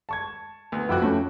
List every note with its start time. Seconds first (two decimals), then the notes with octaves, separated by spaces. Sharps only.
0.09 A5 C#6 G#6
0.72 D2 B3
0.89 F2 E4 F#4 G5 D6
1.02 A3 C#4